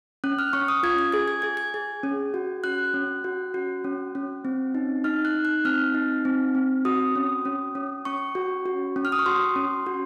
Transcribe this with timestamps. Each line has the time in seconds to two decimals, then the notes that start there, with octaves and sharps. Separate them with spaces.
0.24 C#4 F#6
0.39 F6
0.53 C#4 C#6
0.68 D#6
0.83 F4 G#6
0.99 G#6
1.12 G#4 G#6
1.28 G#6
1.42 G#4 G#6
1.57 G#6
1.74 G#4
2.03 C#4
2.34 F#4
2.64 F#4 F#6
2.94 C#4
3.24 F#4
3.54 F#4
3.84 C#4
4.15 C#4
4.45 C4
4.75 D#4
5.04 D#4 F6
5.25 F#6
5.35 D#4
5.45 F#6
5.65 C4 F6
5.95 D#4
6.25 C4
6.55 C4
6.85 F#4 D#6
7.16 C#4
7.45 C#4
7.75 C#4
8.05 C#4 C#6
8.35 F#4
8.66 F#4
8.96 C#4
9.05 F6
9.12 D#6
9.19 C#6
9.26 F#4 C6
9.56 C#4
9.86 F#4